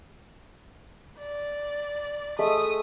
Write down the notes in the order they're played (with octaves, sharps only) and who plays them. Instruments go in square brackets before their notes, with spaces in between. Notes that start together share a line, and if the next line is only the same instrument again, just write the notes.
[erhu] D5
[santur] G#3 A3 E5 [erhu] D#6